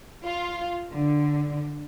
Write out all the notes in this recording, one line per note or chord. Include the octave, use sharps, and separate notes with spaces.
F4
D3